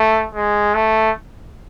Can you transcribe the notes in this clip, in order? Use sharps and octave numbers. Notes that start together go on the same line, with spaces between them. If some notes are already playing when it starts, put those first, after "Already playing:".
Already playing: A3
G#3
A3